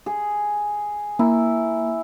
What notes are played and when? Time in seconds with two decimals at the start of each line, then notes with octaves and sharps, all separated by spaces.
0.06 G#4
1.19 A#3 E4